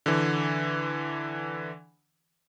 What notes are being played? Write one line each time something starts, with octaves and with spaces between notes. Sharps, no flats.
D3 E3